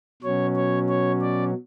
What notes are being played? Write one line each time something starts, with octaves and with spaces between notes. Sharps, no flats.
B2 F#3 C#4 C#5
C#5
C#5
D5